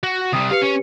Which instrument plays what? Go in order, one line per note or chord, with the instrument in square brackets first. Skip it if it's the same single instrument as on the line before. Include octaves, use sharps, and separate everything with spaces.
[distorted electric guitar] F#4
[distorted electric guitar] C3 G3 [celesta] D#6
[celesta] G4 B4 C#7 [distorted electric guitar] F5
[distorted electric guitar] C#4